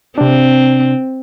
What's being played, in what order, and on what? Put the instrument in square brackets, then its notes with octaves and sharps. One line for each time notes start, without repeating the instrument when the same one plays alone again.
[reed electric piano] C3 D4 [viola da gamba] C4